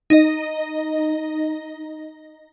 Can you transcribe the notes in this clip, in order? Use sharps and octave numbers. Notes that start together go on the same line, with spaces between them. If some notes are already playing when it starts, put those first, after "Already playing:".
D#4 D#5